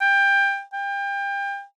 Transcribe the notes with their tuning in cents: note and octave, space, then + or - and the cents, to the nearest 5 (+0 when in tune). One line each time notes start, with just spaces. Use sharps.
G5 +20
G5 +30